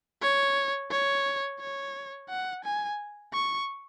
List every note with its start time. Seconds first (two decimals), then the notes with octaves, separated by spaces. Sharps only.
0.22 C#5
0.91 C#5
1.60 C#5
2.29 F#5
2.64 G#5
3.33 C#6